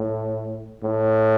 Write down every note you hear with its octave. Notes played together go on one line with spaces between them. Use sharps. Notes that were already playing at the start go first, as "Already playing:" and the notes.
Already playing: A2
A2